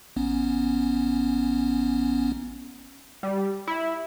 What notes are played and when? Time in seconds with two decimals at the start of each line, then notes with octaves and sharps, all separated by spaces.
0.16 A1 B3 C#4
3.23 G3
3.67 E4